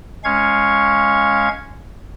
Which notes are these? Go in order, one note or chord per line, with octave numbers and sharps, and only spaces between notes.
G#3 C#4 F5 C#6 G#6